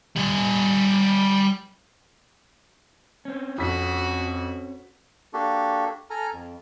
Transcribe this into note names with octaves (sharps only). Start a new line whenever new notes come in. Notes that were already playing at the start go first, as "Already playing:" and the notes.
G3 G#5
C4 C#4
F2 F#4 B6
A#3 D4 F#4 G4 A4
A4 G#5 A#5 F6
F2